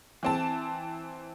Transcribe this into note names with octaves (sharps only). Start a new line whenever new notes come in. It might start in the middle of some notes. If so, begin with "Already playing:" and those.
E3 C4 A5